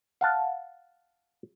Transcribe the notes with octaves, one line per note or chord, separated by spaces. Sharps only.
F5 F#5 A5